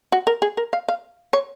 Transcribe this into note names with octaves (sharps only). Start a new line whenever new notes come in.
F#4
A#4
G#4
A#4
F5
F5
C#5